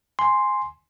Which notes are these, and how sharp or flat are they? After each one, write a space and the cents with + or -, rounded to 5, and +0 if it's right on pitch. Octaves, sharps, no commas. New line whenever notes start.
G#5 +0 C6 +0